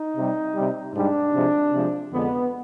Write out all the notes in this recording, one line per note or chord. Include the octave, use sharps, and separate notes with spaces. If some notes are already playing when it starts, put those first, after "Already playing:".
Already playing: D#4
C3 G3
C3 G3
G#2 G3 D4
C3 F3 G#3
C3 F3 G#3
F2 D3 G#3 B3